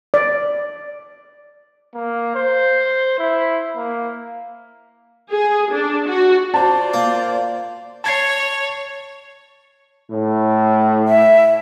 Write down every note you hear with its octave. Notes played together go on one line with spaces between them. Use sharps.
D5
A#3
C5
E4
A#3
G#4
D4
F#4
F4 C5 D5 A5
A#3
C#5 A5 G#6 C7
A2
E5